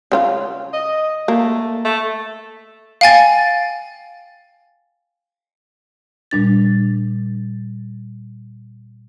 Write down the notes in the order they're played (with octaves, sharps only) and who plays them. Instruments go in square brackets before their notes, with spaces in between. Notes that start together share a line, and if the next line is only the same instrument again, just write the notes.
[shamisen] C#3 C4 F4
[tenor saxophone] D#5
[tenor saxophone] A3 [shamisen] A#3
[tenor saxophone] A3
[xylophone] F5 G5 G#5 A6
[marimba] A#2 G3 D4 A6